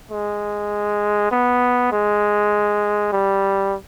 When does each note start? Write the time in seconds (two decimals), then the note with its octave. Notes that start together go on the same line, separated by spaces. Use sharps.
0.11 G#3
1.31 B3
1.92 G#3
3.12 G3